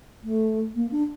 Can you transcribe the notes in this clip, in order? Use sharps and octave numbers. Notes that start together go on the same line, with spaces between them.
A3
A#3
D4